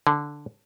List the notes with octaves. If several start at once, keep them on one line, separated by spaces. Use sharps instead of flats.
D3